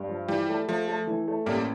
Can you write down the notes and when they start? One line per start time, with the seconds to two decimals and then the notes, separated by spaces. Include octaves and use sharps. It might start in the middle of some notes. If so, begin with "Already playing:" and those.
Already playing: G2
0.09 F3
0.28 E3 G3
0.49 A3
0.68 F3 A3
0.88 A3
1.07 E3
1.28 A3
1.46 A1 G3 A#3